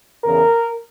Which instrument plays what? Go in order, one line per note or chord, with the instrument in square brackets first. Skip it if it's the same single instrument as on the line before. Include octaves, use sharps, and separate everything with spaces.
[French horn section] E2 C#3 E3 A#4